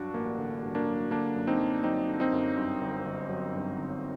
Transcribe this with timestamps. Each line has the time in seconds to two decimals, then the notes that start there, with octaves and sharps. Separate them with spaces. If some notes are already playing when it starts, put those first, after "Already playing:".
Already playing: G2 F#3 D4 F#4
0.14 A1 A#3
0.38 D3
0.63 G2
0.75 A#3 D4
0.87 F#3
1.11 D3 A#3 D4
1.35 F#2
1.47 C4 D#4
1.60 F#2
1.84 F#3 C4 D#4
2.08 D3
2.20 C4 D#4
2.33 F#2
2.57 G2
2.81 G1
3.06 G1
3.29 F#3
3.55 G2
3.78 G1